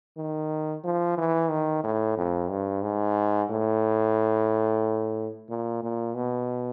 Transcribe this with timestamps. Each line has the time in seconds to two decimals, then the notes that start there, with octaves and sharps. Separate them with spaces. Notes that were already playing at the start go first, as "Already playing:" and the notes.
0.17 D#3
0.84 F3
1.18 E3
1.50 D#3
1.84 A2
2.17 F2
2.51 G2
2.83 G#2
3.50 A2
5.49 A#2
5.83 A#2
6.16 B2